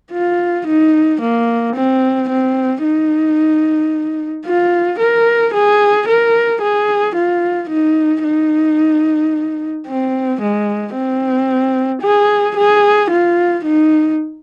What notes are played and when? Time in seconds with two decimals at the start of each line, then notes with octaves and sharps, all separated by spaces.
0.12 F4
0.67 D#4
1.21 A#3
1.75 C4
2.29 C4
2.83 D#4
4.45 F4
4.99 A#4
5.53 G#4
6.08 A#4
6.61 G#4
7.15 F4
7.69 D#4
8.23 D#4
9.87 C4
10.41 G#3
10.94 C4
12.02 G#4
12.57 G#4
13.10 F4
13.64 D#4